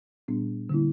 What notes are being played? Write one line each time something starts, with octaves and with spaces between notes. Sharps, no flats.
A#2 G3 B3 D4
D3 G3 A#3 C#4 E4